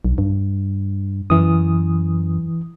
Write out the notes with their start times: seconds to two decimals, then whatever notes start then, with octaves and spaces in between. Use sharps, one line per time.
0.05 B1
0.18 G2
1.30 F#2 E3 D#6